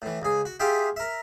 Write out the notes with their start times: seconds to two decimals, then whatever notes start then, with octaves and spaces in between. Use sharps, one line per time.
0.02 A2 E3
0.22 C#2 G#4
0.45 F#4
0.60 F4 G4 G#4 E5 G5
0.96 A#4 E5